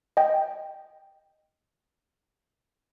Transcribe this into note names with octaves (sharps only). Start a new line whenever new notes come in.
D#5 G5